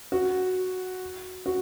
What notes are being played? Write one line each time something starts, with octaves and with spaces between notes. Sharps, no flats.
F#4
F#4